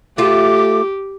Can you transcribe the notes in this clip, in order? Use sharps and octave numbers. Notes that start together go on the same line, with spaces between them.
A3 F4 G4 D6